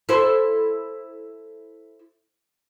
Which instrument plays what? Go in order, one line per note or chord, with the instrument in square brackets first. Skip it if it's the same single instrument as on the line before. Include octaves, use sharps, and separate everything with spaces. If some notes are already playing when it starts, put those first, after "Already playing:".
[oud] E4 A4 C5